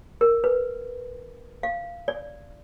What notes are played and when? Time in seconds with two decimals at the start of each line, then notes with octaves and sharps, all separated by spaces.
0.21 A#4
0.44 B4
1.63 F5
2.08 D5